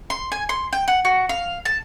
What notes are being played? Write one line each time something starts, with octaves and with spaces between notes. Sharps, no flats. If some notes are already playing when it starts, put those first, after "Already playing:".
C6
G#5
C6
G5
F#5
F#4
F5
A5